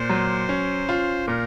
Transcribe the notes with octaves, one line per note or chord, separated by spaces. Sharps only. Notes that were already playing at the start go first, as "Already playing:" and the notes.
Already playing: A#2 C5
F#3
C#4
F4
A#2 A#4